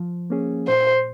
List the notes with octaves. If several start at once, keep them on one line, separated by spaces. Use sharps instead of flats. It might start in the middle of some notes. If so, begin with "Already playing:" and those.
Already playing: F3
A#3 C#4 G#4
A#2 C5